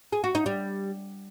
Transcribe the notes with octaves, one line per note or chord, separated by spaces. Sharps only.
G#4
F#4
D#4
G3